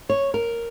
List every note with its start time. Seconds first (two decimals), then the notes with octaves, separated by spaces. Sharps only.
0.09 C#5
0.34 A#4